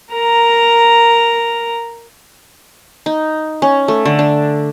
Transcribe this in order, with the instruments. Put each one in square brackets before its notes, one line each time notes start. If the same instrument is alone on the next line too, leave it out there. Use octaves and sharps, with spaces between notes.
[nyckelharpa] A#4 A#5
[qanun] D#4
C#4
A3
D3
D4